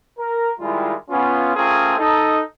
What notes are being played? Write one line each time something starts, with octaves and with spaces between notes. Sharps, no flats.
A#4
D#3 G3 G#3 E4 F4
B3 C#4 F4
A3 C4 C#4 F4 G#4 A#4
D#4 A4 D#5